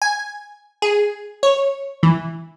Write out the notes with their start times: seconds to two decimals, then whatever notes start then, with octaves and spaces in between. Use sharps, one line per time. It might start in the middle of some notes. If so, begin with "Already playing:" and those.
0.02 G#5
0.82 G#4
1.43 C#5
2.03 E3